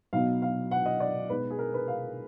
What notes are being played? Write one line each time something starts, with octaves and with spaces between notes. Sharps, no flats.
B2 F#3 B3 D#4 F5
F5
F#5
D#5
D5
B2 G#3 D#4 B4
G#4
A#4
B4
F5